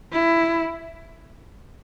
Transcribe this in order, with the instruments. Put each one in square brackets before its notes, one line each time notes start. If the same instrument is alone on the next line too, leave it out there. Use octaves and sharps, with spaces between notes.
[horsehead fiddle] E4